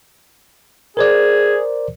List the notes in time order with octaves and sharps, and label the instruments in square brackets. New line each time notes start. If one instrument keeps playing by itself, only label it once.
[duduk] G#4 [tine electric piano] A#4 C5 D5